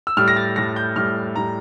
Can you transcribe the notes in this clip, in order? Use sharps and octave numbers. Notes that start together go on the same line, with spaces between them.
E6
A2 G3 F6
A#6
A6
A2 G3 A#6
G6
A2 G3 F6
A2 G3 A#5